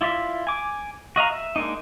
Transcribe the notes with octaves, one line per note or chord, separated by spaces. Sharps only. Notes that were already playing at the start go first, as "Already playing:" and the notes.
E4 F4 D5 E5
G#5 D6
F#4 D#5 F5 A#5
E5
G#3 A#3 D4 D#4